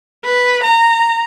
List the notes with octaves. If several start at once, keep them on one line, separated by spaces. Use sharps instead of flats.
B4
A#5